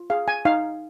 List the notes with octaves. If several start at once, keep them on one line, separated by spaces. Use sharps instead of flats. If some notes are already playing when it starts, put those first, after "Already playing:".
Already playing: F4
G#4 F5
G#5
D#4 F5